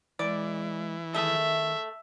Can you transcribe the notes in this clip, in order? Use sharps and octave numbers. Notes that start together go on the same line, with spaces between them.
E3 G#3 D5
D#3 A3 G#4 E5